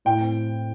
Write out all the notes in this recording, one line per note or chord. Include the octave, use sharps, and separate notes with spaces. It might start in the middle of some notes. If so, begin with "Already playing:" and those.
A2 G5
C4